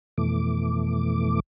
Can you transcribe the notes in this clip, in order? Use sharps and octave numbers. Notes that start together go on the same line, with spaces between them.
F2 B2 E3 A3 D6